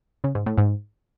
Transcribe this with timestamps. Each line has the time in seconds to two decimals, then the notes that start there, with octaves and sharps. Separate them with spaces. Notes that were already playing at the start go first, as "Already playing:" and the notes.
0.24 C#3
0.35 G#2
0.46 A2
0.58 G#2